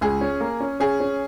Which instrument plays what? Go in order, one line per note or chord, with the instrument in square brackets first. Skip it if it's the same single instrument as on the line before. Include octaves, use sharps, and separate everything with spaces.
[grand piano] C#2 [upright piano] G#4
[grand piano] C#4
A#3
C#4
[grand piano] C#4 [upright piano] G#4
[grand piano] C#4